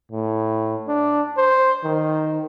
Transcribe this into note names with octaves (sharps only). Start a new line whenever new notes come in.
A2
D4
C5
D#3